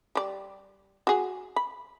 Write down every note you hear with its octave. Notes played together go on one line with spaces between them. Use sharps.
G3 D5
F#4 G#4
B5